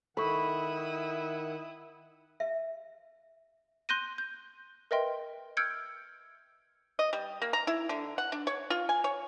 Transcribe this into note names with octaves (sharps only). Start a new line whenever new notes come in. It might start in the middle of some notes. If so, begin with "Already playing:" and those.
D#3 E4 A4 F#5 B5 C#6 D#6
E5
C6 F#6 G6 A#6 D#7
G6
A#4 B4 D#5 E5 G5 C6
E6 F6 G6 G#6 C#7 D7
D#5
G3
A#3
A#5
E4
D3
F#5
D4
C#5
F4
G#5
C#5